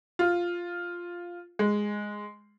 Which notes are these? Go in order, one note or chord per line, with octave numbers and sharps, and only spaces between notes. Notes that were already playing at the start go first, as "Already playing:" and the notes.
F4
G#3